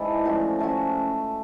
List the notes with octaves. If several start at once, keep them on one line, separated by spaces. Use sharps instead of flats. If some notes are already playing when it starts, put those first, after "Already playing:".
Already playing: G#2 E3 D4
F3 A3 C#4 F#4
F3 A3 C#4 F#4